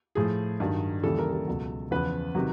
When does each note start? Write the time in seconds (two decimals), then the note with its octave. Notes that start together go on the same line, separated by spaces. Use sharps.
0.15 A2 F3 G#4
0.60 G2 D#3 F#3
1.03 D#2 C#3 E3 G3 A4
1.19 A#4
1.33 A4
1.47 C#2 B2 F#3
1.91 E2 C#3 F3 B4
2.35 C3 D#3 F#3